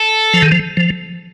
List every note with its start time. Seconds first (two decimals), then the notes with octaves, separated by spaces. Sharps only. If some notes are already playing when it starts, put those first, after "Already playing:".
Already playing: A4
0.33 F3
0.42 D#3
0.52 F3
0.77 F3